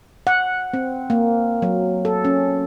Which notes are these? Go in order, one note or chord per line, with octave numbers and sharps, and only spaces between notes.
F#5
C4
A#3
F#3
A4
C#4